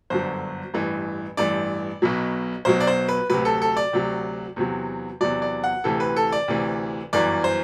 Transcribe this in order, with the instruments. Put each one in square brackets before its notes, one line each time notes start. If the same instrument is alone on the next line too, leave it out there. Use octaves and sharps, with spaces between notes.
[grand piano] G1 F#2 D3 F#3 C5
A1 G2 E3
A1 G2 E3 D5
B1 B2 F#3
B1 B2 F#3 C5
D5
C5
B4
D2 C3 F#3 B4
A4
A4
D5
D2 C3 F#3
E2 C3 F#3
E2 C3 F#3 D5
D5
F#5
D2 C3 E3 A4
B4
A4
D5
D2 C3 E3
G1 F#2 E3 D5
C5